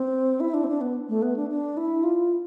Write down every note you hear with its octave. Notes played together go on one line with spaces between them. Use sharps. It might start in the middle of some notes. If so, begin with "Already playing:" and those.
Already playing: C4
E4
D4
C4
D4
B3
A3
B3
D4
D4
E4
F4